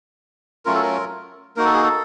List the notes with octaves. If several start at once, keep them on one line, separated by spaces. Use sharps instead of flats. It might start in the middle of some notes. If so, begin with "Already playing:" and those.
F#3 A3 C#4 F4 A#4
A4
A#4
A#3 D#4 F#4 A#4
A4
G#4
A4